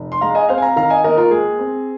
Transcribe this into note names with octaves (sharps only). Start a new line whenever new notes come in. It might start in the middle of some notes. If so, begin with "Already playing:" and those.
Already playing: F1
C6
G#3 F5 A#5
D#5 G#5
C4 C5 F5
G#5
F5 A#5
D#3 F5 A#5
D#5 G#5
D#2 A#4 D#5
F4 A#4
G#3 G#4
C4